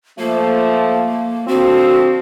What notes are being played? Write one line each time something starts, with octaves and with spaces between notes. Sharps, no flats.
F3 A3 A#3
D3 F3 C4 F#4